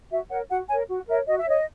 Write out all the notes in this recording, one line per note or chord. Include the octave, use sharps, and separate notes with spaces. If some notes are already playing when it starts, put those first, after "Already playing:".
F#4 E5
A#4 C#5 F#5
F#4 F#5
A#4 C#5 G#5
F#4
A#4 C#5 E5
F#4 D#5
E5
C#5 D#5